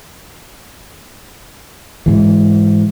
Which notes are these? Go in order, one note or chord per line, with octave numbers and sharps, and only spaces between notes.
G#2 E3